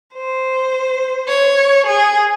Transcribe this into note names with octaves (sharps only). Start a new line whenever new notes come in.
C5
C#5
G#4